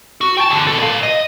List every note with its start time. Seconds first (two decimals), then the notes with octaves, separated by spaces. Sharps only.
0.21 F#4
0.37 G5 A5
0.50 E2 D3
0.67 B2 A4
0.79 D5 F5
1.03 D#5